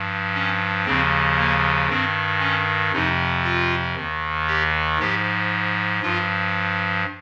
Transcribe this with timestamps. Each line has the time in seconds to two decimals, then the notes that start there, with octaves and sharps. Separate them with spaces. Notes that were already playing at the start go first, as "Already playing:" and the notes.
Already playing: G2 F3
0.34 C#4
0.85 D#2 C#3 F3 C4
1.37 A#3
1.89 G2 D#3 C4
2.40 C#4
2.93 F2 C3 F3 D#4
3.44 F4
3.95 D#2 D#3
4.47 G4
4.98 G#2 F3 G4
6.02 G2 F3 F4